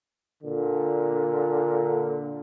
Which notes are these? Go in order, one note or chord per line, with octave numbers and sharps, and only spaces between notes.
A#2 D3